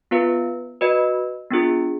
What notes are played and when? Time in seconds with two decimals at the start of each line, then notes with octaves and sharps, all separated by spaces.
0.11 B3 F4 B4 F5
0.81 F#4 B4 D#5
1.50 B3 D4 F4 G#4